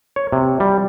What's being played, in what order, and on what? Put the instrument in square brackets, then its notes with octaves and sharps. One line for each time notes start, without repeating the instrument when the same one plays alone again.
[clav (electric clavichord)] C#5
C3
G3